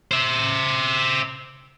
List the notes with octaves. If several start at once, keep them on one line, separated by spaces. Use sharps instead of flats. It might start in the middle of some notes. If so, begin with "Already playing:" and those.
C5 E5